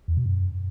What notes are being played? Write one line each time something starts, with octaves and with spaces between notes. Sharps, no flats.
E2
B2
F#2